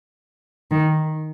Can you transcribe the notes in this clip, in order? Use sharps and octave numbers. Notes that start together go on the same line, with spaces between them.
D#3